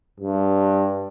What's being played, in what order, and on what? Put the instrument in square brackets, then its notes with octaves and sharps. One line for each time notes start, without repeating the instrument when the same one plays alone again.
[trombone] G2